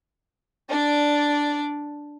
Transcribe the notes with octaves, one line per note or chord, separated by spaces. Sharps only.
D4 D5